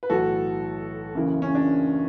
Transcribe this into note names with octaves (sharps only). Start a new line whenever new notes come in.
B4
B1 A2 E3 F#4 A4
F#1 F#2 C#3 E3
C#4
D4